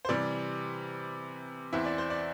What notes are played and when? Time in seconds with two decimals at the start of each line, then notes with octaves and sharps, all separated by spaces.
0.05 C5
0.09 C3 E3 G3 D5
1.73 E2 E3 C4 E4 E5
1.85 D5
1.98 C5
2.10 D5